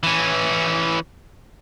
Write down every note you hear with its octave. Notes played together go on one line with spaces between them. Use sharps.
E3 C#4